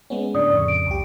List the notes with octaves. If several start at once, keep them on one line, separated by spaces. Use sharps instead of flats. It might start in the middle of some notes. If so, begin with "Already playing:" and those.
G#3 B3 C#4
A2 D3 D5 D#6
F2 C#3 C#6
D7
C2 G4